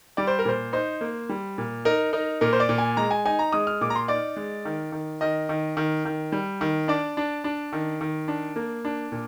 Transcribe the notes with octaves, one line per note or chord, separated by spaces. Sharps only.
G3 D5
C5
A#4
A#2 C5
D#4 C5
A#3
G3
A#2
D#4 A#4
D#4 A#4
A#2 A#4
C5
D5
A#2
G#5
G#3 A#5
G#5
D#4 G#5
A#5
G#3 D#6
F6
A#2 D6
A#5
C6
D#4 D5
G#3
D#3
D#3
D#3 D#5
D#3
D#3
D#3
G3
D#3
D4 D5
D4
D4
D#3
D#3
D4
A#3
D4
A#2